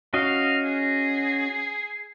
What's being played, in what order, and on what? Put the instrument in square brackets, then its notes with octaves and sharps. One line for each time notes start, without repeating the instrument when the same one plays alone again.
[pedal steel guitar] C#4 F#4 D#5 [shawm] F5
[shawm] G#4